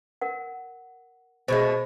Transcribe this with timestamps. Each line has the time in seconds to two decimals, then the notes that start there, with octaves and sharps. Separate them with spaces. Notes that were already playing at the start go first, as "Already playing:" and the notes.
0.21 A#4 F#5
1.48 B2 G#3 A3 C5 D#5